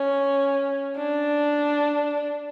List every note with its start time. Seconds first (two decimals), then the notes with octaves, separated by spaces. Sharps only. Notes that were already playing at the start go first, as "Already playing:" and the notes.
Already playing: C#4
0.96 D4